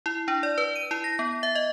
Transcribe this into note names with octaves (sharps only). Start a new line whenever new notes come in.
E4
D4
D5
B4
D#7
E4
A#6
B3
E5
D#5